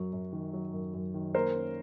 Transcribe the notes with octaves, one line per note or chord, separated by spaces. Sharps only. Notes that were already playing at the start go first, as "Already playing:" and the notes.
Already playing: F#2 F#3
F#2
D#3
F#3
F#2
F#2
D#3
A#3 A#4 C5
C#4